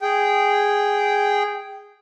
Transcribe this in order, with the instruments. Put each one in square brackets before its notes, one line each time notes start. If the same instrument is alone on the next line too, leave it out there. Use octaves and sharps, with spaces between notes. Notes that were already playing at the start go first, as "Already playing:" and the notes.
[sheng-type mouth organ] G#4 G5